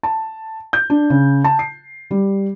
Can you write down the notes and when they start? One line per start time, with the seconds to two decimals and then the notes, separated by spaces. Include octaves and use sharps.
0.03 A5
0.73 G6
0.90 D4
1.10 C#3
1.44 A5
1.59 C7
2.11 G3